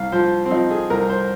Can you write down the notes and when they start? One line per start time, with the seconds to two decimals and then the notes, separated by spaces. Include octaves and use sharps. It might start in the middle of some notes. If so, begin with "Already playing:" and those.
Already playing: C2 F5
0.12 F3 C5
0.45 C4
0.51 F3 D#4
0.71 G#4
0.90 C2 A#4
1.09 C5